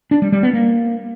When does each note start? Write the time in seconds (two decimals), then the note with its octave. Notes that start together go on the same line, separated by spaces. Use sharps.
0.11 D4
0.22 G3
0.32 G3
0.43 B3
0.53 A#3